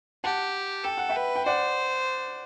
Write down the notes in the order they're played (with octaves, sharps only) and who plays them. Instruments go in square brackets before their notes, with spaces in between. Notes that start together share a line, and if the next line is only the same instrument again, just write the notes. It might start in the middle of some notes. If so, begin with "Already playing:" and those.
[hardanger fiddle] G4 [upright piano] F#5 A5
[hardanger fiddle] A4 [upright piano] G5
[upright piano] F#5
E5 G5
[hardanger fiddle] B4
[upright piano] G5
[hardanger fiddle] C5 [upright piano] D5 F#5